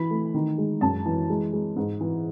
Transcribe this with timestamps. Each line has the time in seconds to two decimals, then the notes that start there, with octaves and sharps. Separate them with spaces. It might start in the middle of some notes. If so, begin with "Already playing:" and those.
Already playing: E3 B5
0.10 A3
0.34 D#3
0.58 G#3
0.81 F#2 A5
1.06 E3
1.30 G#3
1.53 G#3
1.76 G#2
2.01 E3